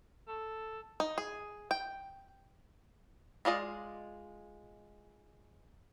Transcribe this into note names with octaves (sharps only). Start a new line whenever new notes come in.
A4
D#4
G#4
G5
G#3 F4 D5 D#5